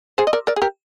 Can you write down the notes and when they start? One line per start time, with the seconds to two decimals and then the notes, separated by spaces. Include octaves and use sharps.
0.18 G#4 C5
0.27 D#5
0.33 A#4 D5
0.47 A#4 D5
0.56 G#4
0.62 G4 A#4